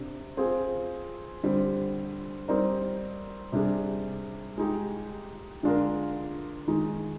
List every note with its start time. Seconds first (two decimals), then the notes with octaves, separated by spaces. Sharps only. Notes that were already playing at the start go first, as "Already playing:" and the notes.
Already playing: C3 D4
0.37 C4 F4 G#4
1.43 D3 G3 C4
2.48 G3 C4 D#4 A#4 D5
3.52 C3 G3 D4 G#4
4.58 G#3 D#4 G4
5.63 D3 G#3 D4 F4 A#4
6.67 D#3 G#3 D#4